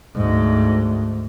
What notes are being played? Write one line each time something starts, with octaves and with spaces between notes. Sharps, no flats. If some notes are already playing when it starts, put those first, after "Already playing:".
D2 G#2